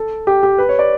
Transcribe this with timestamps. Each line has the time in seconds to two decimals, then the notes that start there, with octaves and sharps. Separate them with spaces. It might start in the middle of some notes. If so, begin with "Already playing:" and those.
Already playing: A4
0.27 G4
0.43 G4
0.58 B4
0.69 C#5
0.79 D5